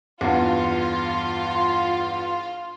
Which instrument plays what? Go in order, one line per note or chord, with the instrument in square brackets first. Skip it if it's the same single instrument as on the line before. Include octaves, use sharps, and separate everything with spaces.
[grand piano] E2 G2 [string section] F4